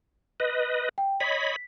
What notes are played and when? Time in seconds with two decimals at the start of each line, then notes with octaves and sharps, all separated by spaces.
0.40 B4 D#5
0.98 G5
1.20 C#5 D#5 B5 B6